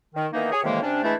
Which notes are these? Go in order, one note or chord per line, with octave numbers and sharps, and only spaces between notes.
D#3
D#3 E3 A#3 B3 D#4
G#4 C#5
A2 C3 D#3 E3 G#3 A#3
C3 G3 C#4 D4
E3 G#3 A3 D4 E4